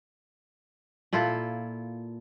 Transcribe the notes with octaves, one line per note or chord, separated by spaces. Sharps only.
A#2 E4 F4 A4